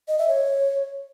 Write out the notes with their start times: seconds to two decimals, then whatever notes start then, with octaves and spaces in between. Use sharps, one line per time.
0.08 D#5
0.18 E5
0.28 C#5